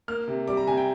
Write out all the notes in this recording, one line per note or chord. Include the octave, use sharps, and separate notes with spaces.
A#3 F6
C3
G3 D6
A#5
C3 G#5
G5